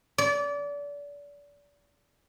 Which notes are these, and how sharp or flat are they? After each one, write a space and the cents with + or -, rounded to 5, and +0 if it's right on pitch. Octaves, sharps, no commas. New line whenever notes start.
D5 -30